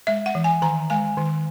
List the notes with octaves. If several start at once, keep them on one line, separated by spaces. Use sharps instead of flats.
G#3 E5
F#5
E3
G#5
D#3 A#5
G#3 G#5
D#3